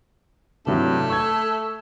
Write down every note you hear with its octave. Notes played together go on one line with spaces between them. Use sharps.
G2 C3 F#3 A3 E4
C#6 E6 G#6